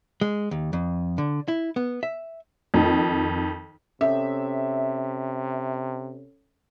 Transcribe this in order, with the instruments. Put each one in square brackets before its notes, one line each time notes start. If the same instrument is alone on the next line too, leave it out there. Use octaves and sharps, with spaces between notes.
[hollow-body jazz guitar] G#3
D#2
F2
D3
E4
B3
E5
[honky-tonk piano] F2 D#3
[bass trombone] C3 [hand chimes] C#4 A4 C#5 [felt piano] E5